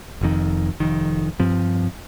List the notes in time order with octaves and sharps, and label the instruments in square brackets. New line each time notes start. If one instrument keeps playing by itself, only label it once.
[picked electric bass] F1 F2 D#3
F1 F2 D#3
G2 F3 C4